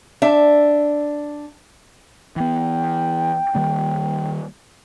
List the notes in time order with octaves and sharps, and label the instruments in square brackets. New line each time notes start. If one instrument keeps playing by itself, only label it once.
[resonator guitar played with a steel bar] D4 E5
[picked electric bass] E3 B3 [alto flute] G5
[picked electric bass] D#3 G3 A#3